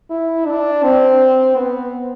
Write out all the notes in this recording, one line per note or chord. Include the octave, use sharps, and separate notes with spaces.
E4
D4
C4
B3